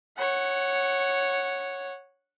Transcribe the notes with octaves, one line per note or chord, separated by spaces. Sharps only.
C#5 F#5